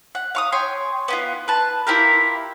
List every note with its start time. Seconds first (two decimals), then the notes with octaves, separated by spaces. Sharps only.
0.15 F#5
0.35 F5 C#6 D#6
0.52 C#5 G5 G#5 C6
1.08 B3 E4 F4
1.48 B4 A5
1.87 E4 F4 G4 A#4